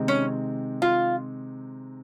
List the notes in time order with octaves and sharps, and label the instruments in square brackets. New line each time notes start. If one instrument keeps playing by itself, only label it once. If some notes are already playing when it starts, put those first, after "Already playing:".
Already playing: [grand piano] C3 D#3 G#3 C4 D#4
[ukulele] C#4
F4